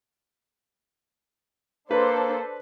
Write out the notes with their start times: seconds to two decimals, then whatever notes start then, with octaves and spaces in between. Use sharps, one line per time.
1.91 A#3 D4 A4 B4 C5